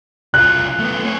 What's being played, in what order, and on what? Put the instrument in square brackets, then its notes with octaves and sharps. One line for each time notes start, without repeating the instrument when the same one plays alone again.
[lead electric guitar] C2 F4 [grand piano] F#6
[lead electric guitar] A3 B3
C4 C#5